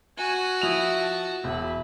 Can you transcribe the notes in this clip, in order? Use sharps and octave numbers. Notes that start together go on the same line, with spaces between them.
F#4 G#5
F3 E4 D#6 F7
A5
E1 E5 B5